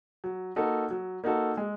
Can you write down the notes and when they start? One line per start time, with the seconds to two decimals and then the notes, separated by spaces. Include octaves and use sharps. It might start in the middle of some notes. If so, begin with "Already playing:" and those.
0.24 F#3
0.56 A#3 D#4 F#4 A4
0.91 F#3
1.24 A#3 D#4 F#4 A4
1.57 G#3